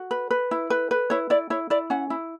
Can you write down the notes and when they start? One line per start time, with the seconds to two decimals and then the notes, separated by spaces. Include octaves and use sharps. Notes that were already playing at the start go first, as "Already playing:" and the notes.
Already playing: F#4
0.11 B4
0.31 B4
0.51 E4
0.70 B4
0.91 B4
1.10 E4 C#5
1.30 E4 D5
1.50 E4 C#5
1.70 E4 D5
1.90 C#4 F#5
2.10 E4